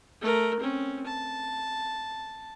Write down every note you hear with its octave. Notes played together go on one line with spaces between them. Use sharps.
A3 A#4
C4 C#4
A5